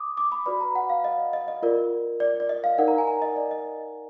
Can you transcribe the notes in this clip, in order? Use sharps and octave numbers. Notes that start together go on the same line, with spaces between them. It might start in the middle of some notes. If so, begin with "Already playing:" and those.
Already playing: D6 D#6
D6
B5
F#4 B4 D5 B5
A#5
F#5
F5
D#5
D#5
D#5
F4 A#4 D5
D5
D5
D#5
F5
D#4 A#4 D5 F#5
A#5
G#5
A#5
D#5
D5
D#5